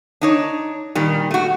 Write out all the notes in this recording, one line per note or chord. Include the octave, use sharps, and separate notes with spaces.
D4 D#4 C#5
A#2 D#3 G3
A3 F#4